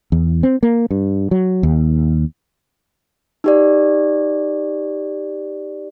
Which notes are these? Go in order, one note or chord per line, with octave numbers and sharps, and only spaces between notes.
E2
C4
A#3
G2
F#3
D#2
D#4 G4 D5